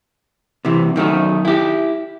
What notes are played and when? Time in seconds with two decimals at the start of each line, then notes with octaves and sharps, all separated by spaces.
0.65 C3 E3
0.96 F#2 D#3 A3 D#4
1.45 E4 G4